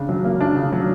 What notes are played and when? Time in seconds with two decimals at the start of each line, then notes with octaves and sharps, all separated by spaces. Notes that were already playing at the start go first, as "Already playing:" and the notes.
Already playing: C#3 D4
0.09 F#3
0.25 A#3
0.41 D4
0.56 C#3
0.72 F#3